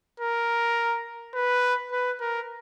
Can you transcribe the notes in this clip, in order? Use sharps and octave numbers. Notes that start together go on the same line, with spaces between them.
A#4
B4
B4
A#4